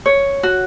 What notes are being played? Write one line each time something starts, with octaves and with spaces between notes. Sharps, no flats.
C#5
F#4